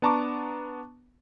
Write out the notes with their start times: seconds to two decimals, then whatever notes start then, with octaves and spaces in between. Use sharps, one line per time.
0.02 B3 D4 A5 A#5 C#6 D6